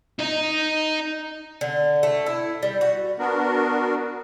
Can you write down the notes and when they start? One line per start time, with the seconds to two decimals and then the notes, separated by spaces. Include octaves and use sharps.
0.19 D#4 D#5
1.61 D3
2.03 A3
2.26 E4
2.63 G3
2.81 F#4
3.19 B3 D4 F#4 A#4